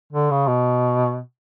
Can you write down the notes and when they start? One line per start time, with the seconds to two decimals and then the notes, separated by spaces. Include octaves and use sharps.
0.13 D3
0.31 C#3
0.47 B2